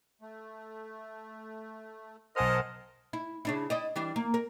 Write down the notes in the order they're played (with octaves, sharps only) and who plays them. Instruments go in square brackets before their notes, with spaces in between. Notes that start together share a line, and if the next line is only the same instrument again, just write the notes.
[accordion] A3
[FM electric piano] B1 G#5 F6 [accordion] A#4 F#5 A5 [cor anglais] C5 [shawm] D#5
[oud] E4
C#3 D4 E4
E4 D5 D#5
E3 G3 D4
A#3
A#4